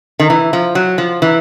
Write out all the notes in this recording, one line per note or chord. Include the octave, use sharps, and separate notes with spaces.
D#3
E3
F3
F#3
F3
E3